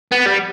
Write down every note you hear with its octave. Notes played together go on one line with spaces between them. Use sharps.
B3
G3